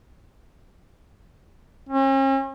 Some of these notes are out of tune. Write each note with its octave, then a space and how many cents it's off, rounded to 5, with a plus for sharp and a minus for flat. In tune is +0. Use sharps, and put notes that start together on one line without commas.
C#4 -45